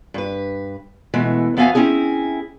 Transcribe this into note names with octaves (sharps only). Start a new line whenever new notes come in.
G2 B4
B2 E3 G#3 A3
F2 B3 F#4 E5 F5 G#5
C4 C#4 E4 G#4